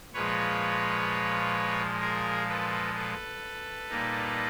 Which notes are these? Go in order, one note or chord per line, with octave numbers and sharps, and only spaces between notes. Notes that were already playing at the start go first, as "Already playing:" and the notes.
A#2 F3 G#3 B4 C#5
G#4 A#4
A4 B4
A4 B4
A#2 G3 A#3 D#4